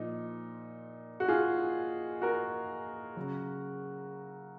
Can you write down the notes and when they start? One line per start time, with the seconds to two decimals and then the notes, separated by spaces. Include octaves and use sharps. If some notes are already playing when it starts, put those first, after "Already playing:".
Already playing: A#2 F3 D#4
1.20 F#4
1.28 F4 G#4
2.22 F#4 A#4
3.17 C#3 F#3